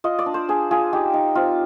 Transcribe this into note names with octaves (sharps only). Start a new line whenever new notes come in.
F4 D#5
D5
D4
C5
D4 G#4
F4 G#4
D#4 G4
D#4
C4 F4